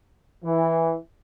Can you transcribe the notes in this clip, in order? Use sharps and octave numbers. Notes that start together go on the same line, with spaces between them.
E3